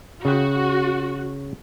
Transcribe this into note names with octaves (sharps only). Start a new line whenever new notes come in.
C#3 F#4 G5